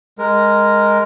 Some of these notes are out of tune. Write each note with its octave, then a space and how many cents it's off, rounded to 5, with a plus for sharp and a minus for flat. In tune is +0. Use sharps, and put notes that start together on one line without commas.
G#3 +0 A#4 +0